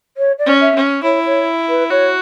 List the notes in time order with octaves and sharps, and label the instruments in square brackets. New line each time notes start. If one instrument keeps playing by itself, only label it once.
[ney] C#5
D5
[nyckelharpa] C#4
[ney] E5
[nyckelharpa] C#4
[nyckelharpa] E4 [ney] C#5
[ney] C#5
B4
[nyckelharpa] F#4 [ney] C#5